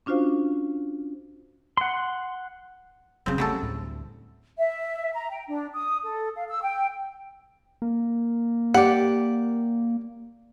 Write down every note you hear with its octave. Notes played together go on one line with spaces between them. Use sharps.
C#4 D4 F4 F#4 C5 F5
F#5 C6
E1 C#3 F#3 C4
G#1 F#3 G3 A3 C#4 A4
D2 A2
E5
A#5
G5
D4
D#6
A4
F5
E6
G5
A#3
G4 D5 F#5